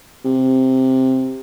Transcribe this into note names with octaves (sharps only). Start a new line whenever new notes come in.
C3